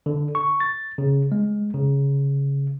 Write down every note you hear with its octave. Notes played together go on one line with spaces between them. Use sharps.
D3
C#6
A6
C#3
G#3
C#3